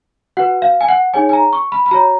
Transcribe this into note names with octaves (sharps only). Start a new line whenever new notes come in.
F#4 B4 F#5
F5
G#5
F#5
D#4 G#4 C#5 G#5
G#5
A#5
C#6
B5
B5
F#4 C#5 A#5